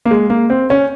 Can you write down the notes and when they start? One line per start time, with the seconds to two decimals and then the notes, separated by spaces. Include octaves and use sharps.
0.06 A#3
0.11 G#3
0.30 A#3
0.50 C4
0.70 C#4